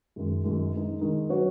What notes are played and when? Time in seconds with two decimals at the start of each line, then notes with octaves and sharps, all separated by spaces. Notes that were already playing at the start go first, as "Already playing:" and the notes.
0.16 F#2 D#3 G#3
0.44 F#2 D#3 G#3
0.72 D#3 G#3 D#4
1.01 D#3 G#3 D#4
1.29 F#3 B3 F#4 C#5